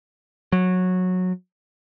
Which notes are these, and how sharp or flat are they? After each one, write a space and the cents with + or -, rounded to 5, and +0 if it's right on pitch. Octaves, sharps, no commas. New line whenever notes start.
F#3 -15